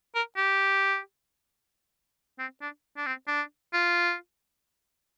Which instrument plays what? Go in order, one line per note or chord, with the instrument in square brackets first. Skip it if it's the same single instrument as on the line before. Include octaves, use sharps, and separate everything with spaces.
[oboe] A#4
G4
C4
D4
D4
C4
D4
F4